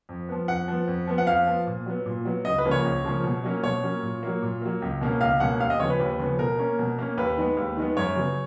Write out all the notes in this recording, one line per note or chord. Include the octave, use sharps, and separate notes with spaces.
F2
F3 B3
F2 F#5
F3 B3
F2
F3 B3
F#5
F2 F5
F3 B3
A#2
F#3 B3
A#2
F#3 B3
C#2 D#5
B4
C#3 F3 A#3 C#4
C#5
C#2
C#3 F3 A#3 C#4
B2
F#3 A#3 C#4
B2 C#5
F#3 A#3 C#4
A#2
F#3 A#3
A#2
F#3 A#3
C#2
B2 A#3 C#4
C#2 F5
B2 A#3 C#4 F#5
D#2 F5
D#5
C#3 F3 B3 C#5
B4
D#2
C#3 F3 B3
B2 A#4
A#3 C#4
B2
A#3 C#4
D#2 B4
D#3 G#3 B3
D#2
D#3 G#3 B3
F#2 C#5
C#3 F#3 B3